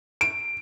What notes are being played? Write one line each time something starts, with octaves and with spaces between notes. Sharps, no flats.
D7